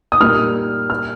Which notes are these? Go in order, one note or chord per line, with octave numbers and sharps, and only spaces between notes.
D#6
A#2 G3 A#3 D#4 F6
F6